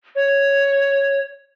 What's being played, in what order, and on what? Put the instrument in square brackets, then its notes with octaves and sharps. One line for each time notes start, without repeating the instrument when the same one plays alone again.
[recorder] C#5